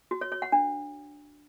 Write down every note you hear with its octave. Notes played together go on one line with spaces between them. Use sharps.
F#4
C#5
C#5
F#5
D4